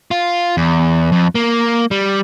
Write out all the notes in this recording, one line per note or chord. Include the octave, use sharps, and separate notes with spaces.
F4
E2
F2
A#3
G3